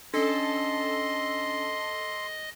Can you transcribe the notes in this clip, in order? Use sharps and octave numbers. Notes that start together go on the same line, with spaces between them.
C#4 D4 A4 D#5 C6